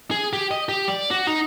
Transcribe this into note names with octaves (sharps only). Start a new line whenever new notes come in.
G#4
G4
D#5
G4
D5
F#4
D#4